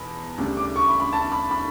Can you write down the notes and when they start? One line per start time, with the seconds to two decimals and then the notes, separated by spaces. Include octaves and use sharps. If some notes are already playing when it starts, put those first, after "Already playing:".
Already playing: E2 B2 B5
0.38 D2 C#3 G3 D4
0.57 D6
0.76 C#6
0.88 B5
1.00 B5
1.13 A5
1.32 B5
1.51 B5